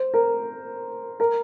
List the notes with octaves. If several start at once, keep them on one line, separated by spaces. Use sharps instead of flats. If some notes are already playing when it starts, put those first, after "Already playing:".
Already playing: C5
A#4
A#4